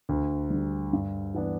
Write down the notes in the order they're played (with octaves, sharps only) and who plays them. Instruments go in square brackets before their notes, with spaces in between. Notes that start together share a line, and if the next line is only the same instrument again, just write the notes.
[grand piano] D2
D3 G3
G2
E3 B3 D4